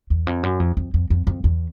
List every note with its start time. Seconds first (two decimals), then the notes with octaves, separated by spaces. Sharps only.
0.10 E2
0.27 F2
0.43 F#2
0.60 F2
0.77 F2
0.94 F2
1.10 F2
1.27 F2
1.44 E2